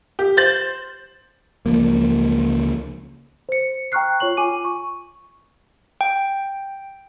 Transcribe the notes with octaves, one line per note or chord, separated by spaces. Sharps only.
G4
C5 G6 A6 F#7
C#2 F3 A#3
C5 C#7
G5 A#5 C#6 F6 F#6 C7
F4 C#5 C#6 F#7
F4 G#5 D6 D#7
C#6
G5